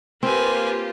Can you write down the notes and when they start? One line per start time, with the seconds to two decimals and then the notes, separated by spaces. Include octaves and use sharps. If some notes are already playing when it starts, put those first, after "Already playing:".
0.23 A#3 C4 F4 G4 B4 G#5